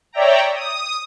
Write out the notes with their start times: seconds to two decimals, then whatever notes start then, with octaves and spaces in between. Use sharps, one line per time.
0.13 C#5 D5 E5 G5 A#5
0.54 D#6